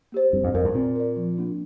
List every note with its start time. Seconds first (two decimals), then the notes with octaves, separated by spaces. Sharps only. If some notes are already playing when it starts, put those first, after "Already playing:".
0.12 A#3 G4 C5
0.33 G2 C4
0.44 F2
0.54 F2 A#4 D5
0.64 G2
0.74 A#2 C4
0.96 A#4 D5
1.16 F3
1.38 A#3 D4